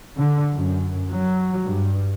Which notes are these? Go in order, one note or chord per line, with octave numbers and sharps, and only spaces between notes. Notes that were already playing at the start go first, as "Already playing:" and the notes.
D3
F#2
F#3
G2